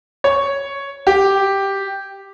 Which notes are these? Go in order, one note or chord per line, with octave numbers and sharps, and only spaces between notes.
C#5
G4